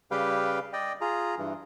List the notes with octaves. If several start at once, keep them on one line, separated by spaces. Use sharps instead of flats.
C#3 G3 G4 B4 F5 G5
D5 D#5 G5
F4 G#4 A#5
G2 E3